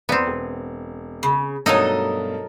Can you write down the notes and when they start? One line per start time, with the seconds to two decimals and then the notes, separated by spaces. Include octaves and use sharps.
0.09 E2 B3 C4 D5 A#5
0.27 E1
1.23 C#3
1.66 G2 B2 F#3 A3 D#4 A4 A#4 D#5